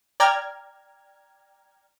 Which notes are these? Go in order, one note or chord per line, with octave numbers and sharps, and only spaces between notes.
D5 G5 A#5 F6 G#6